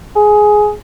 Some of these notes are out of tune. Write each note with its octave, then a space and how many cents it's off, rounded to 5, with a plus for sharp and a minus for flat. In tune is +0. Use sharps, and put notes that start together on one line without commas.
G#4 +10